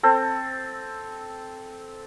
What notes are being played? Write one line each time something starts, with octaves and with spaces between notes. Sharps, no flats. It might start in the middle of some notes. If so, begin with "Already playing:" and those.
C4 A4